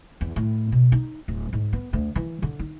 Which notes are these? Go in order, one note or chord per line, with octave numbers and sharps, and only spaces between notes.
E2
A2
B2
D#4
D1
G#2
B3
D2
E3
D3
D#4